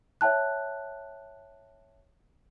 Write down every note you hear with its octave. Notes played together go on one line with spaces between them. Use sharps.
C#5 E5 G5 A5 F#6